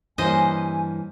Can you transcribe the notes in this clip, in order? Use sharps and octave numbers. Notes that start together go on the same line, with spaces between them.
G2 E3 G3 A#3 C#4 C5 D#5 G#5